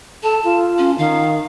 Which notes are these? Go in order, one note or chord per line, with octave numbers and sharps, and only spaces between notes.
A4 A5
F4
C#4
D#3 F5